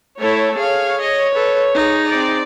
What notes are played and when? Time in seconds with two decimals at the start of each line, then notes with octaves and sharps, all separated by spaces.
0.19 A3 E4 A4 C#5
0.56 G#4 C#5 F5
1.01 D#5
1.34 A4 B4
1.75 D#4 G#4
2.08 C4 D5